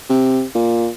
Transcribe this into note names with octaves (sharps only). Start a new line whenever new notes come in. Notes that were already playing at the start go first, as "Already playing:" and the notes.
C3
A#2